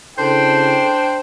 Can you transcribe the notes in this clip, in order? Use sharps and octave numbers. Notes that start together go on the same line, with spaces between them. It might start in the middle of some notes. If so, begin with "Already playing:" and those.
C#3 D4 E4 A4 C5 G5